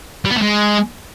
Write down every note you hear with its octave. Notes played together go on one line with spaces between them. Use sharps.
G3
B3
A3
G#3